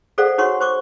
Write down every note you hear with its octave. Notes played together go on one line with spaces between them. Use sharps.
G#4 A4 C5 D5 F5 F#5
D#4 F#4 C#5 F#5 C6 C#6
C5 C#6 D6